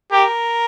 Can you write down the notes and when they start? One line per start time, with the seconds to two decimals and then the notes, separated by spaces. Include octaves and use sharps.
0.12 G4 A#4